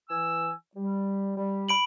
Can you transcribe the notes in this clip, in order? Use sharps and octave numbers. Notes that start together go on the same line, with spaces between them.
E3 G#5 E6
G3
G3
B5 D7 F#7